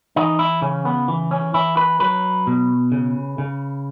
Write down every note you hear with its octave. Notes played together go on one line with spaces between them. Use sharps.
E3 D#4
E4
C#3 C#4
B3
E3
C#4
E3 E4
B4
F#3 B4
B2
C#3
C#3